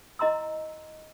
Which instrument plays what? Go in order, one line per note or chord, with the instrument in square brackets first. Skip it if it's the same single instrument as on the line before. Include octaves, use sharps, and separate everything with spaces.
[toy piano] E4 D#5 A#5 C6 E6